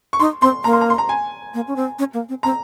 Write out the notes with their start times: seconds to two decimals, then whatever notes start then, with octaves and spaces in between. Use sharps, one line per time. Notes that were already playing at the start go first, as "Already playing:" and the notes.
0.13 C#6
0.20 D#4 C6
0.42 C4 C6
0.64 A#3 A#5
0.73 C6
0.81 A#5
0.90 C6
0.98 A#5
1.09 G#5
1.54 A#3
1.67 C#4
1.76 C4
1.99 C#4
2.14 A#3
2.29 C4
2.43 C4 A#5